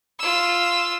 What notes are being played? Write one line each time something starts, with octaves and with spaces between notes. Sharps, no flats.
F4 E6